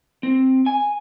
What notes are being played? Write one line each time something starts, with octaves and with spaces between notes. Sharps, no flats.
C4
G#5